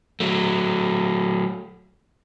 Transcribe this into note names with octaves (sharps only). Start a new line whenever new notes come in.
F#3 A3